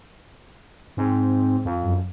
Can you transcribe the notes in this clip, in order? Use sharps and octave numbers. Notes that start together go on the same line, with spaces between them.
G#2 C4
F2
F#2